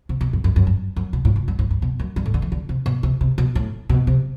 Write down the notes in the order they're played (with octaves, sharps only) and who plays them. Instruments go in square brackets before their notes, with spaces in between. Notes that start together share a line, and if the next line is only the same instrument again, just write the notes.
[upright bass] C3
B2
F#2
F#2
F#2
G2
F#2
B2
A2
B2
G2
A2
G2
B2
F#2
G2
A2
D3
E3
D3
C3
B2
C3
C3
B2
A2
B2
C3